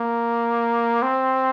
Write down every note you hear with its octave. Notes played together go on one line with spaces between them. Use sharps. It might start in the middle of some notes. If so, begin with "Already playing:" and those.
Already playing: A#3
C4